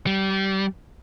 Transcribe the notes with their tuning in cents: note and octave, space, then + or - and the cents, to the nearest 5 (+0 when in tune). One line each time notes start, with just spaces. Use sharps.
G3 -25